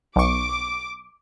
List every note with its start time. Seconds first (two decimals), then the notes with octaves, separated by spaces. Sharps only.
0.16 B1 C#6 D6